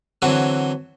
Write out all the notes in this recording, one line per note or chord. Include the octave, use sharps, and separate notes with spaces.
D3 E3 F#3 C4 C#5